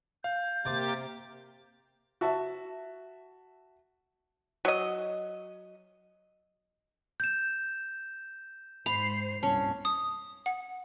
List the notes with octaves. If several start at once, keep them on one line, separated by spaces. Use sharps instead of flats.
F5 G6
C3 A#3 G4 C5 D6 A6
F#4 E5 A5
F#3 D#5
G6 E7
G#2 C5 B5 C7 F7
C2 G2 A#2 C#4 A5
D#6
F#5